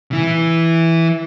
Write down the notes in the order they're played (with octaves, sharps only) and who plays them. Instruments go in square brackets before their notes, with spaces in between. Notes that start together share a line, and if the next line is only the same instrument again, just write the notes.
[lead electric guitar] E3 E4